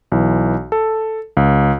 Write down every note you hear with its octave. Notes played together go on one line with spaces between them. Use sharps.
B1 E3
A4
C#2